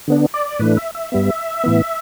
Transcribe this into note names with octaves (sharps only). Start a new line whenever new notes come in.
D3 B3 D4
D5
A2 E3 A3 D4 B4
E5
E5
G2 G3 B3
A2 E3 B3